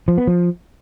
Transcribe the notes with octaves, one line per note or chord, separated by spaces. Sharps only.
F3
B3
F3